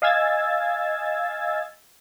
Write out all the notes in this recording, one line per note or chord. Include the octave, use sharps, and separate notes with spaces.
D#5 F5 G#5 E6 G#6 A6